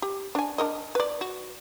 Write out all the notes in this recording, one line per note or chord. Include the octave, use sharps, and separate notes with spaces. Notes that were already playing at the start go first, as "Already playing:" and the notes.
G4
D4 G#5
D4 A#4 D#5
B4 D5
F#4